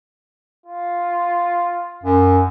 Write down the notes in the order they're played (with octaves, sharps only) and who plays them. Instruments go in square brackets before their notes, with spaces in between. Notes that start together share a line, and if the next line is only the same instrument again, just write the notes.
[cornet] F4
[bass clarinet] F#2